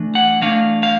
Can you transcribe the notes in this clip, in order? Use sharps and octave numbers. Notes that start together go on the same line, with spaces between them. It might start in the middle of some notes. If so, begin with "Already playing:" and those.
Already playing: E3 A3 D4
F#5
E3 A3 D4 F5
F5